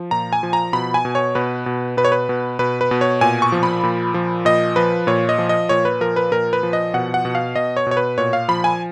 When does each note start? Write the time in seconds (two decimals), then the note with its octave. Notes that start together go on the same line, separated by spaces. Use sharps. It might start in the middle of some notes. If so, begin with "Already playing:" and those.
Already playing: F3
0.11 A#2 A#5
0.33 G#5
0.43 F3
0.53 A#5
0.73 B2 B5
0.94 G#5
1.05 B2
1.15 C#5
1.35 B2 B4
1.66 B2
1.97 B2 B4
2.05 C#5
2.12 B4
2.29 B2
2.59 B2 B4
2.81 B4
2.91 B2
3.01 C#5
3.21 A#2 G#5
3.42 C#6
3.52 F3
3.63 B5
3.83 A#2
4.14 F3
4.45 A#2 D#5
4.76 F3 B4
5.07 A#2 C#5
5.29 D#5
5.38 F3
5.49 D#5
5.69 A#2 C#5
5.85 B4
6.01 F3 A#4
6.16 B4
6.32 A#2 A#4
6.53 B4
6.63 F3
6.73 D#5
6.94 B2 F#5
7.14 F#5
7.25 B2
7.35 F5
7.56 B2 D#5
7.77 C#5
7.87 B2 C#5
7.97 B4
8.18 A#2 C#5
8.33 F5
8.48 F3 B5
8.64 G#5